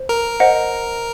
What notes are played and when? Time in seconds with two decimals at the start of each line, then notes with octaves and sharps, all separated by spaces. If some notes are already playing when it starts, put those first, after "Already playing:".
Already playing: C5
0.09 A#4
0.40 C5 D#5 F#5